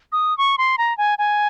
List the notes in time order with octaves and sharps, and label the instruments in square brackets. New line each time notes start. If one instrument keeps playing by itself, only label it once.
[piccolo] D#6
C#6
C6
A#5
G#5
G#5